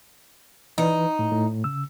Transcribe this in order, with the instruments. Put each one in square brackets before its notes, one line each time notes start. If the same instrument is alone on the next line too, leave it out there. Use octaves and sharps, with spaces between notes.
[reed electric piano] E3 B4 [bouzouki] D#4
[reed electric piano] A2
A2
C#3 E6